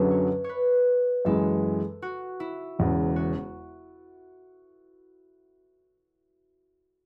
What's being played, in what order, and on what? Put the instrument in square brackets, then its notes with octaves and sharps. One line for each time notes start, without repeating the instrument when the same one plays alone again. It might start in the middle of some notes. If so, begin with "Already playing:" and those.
Already playing: [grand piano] F#2 D3 F#3 C#4 G#4 [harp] B4 E5
[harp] C#5
B4 C#5
[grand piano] F#2 E3 G#3 [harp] A4
[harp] F#4
E4
[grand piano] E1 E2 C#3
[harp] F#4